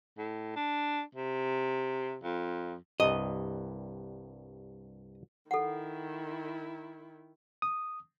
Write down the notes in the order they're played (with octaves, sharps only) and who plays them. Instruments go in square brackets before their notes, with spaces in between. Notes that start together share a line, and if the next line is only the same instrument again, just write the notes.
[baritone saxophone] A2
D4
C3
F2
[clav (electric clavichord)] C2 G2 [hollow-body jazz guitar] D#5
[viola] D#3 E4 [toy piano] A4 F#5
[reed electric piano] D#6